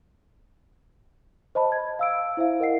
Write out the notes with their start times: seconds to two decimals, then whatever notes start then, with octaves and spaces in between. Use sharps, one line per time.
1.55 C5 D#5 A5 B5
1.72 G#6
1.99 F5 E6 D7
2.37 E4 C5 E5 F5
2.60 A#4 D#5 F#5 C7